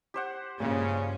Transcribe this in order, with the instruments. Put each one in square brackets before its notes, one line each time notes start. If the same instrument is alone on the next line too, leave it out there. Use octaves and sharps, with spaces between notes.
[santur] G4 C5 F#5
[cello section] G2 G#3 C#4 [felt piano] A#2 [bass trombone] C#3